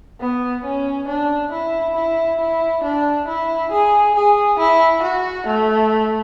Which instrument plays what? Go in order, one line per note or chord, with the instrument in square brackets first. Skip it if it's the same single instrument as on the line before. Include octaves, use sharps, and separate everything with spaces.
[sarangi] B3
C#4
D4
E4
E4
E4
D4
E4
G#4
G#4
E4
F#4
A3